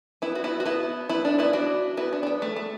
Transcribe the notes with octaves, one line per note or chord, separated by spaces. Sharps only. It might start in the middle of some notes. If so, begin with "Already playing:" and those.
B3 E4
F#4
B3 E4
F#4
B3 E4
B3 E4
D4
B3 E4
D4 F#4
B3 E4
D4
D4
B3
A3
A3